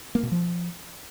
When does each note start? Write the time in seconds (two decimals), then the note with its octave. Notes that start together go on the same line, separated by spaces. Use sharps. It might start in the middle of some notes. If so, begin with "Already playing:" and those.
0.15 A#3
0.23 B2
0.31 F3